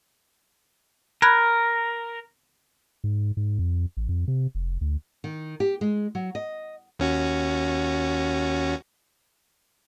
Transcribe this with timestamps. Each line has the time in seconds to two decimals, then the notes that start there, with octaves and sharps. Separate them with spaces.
1.22 A#4 B5 F#6 G#6
3.04 G#2
3.37 G#2
3.59 F2
3.97 A1
4.09 F2
4.28 C3
4.55 F1
4.81 D2
5.24 D#3
5.60 G4
5.81 G#3
6.15 F#3
6.35 D#5
6.99 D#2 C#4 F#4